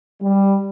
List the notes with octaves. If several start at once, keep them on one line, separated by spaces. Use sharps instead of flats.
G3